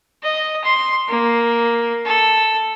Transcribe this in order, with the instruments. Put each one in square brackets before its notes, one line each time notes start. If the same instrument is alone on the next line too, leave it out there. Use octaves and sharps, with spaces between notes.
[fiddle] D#5
C6
A#3
A4